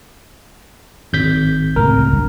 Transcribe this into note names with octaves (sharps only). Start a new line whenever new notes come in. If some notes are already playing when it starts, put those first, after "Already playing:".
G#1 G6 B6
C#2 A2 C3 A#4
G#1 G2